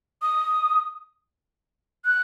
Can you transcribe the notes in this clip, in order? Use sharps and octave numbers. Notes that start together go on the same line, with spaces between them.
D#6
F#6